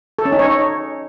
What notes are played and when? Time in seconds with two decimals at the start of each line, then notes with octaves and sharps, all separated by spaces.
0.19 A4
0.25 C#4
0.32 D#4
0.39 C#5